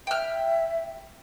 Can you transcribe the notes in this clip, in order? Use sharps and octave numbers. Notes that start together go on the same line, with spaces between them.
E5 G5 F6